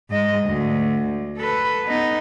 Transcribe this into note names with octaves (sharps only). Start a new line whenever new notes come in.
G#2 D#5
D2
A4 B4
B3 D#4